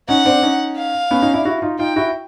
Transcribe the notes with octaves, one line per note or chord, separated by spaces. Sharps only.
C#4 D#4 F#5
C4 D4
C#4 D#4
F5
B3 C#4
C#4 D#4
D4 E4
E4 F#4
D#4 F4
D#4 F4 G5
E4 F#4